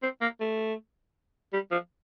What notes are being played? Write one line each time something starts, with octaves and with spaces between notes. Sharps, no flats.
C4
A#3
A3
G3
F3